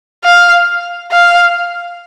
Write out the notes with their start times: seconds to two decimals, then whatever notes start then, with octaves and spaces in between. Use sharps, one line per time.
0.24 F5
1.12 F5